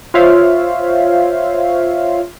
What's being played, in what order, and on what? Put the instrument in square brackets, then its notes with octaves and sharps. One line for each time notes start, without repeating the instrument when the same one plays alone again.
[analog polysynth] F4 C5 C#5 E5 F5